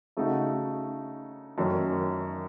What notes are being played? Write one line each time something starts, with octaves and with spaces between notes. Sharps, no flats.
C#3 A3 D#4 F#4
F#2 D#3 A3 C#4